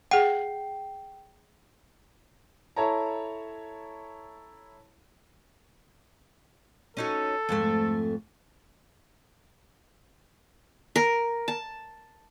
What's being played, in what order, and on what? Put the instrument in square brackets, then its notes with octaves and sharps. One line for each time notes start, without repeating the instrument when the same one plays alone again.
[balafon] G#4 F#5 [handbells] G5
[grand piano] E4 A4 C#5 A5 A#5
[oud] C#4 D#4 F#4 [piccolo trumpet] A4
[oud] F2 G#2 A3
[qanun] A#4
A5